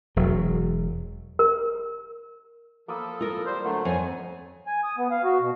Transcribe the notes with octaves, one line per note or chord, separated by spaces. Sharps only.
E1 F#3
A#4
F3 A#3 A4 B5 D#6
F4 A#4
G3 C5
D3 F#3 A3 C5 F#5
F2 C#4 G#5
G#5
D#6
B3
F5
F#4
B2